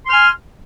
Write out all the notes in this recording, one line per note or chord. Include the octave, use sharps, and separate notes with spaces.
G#5 C6 F6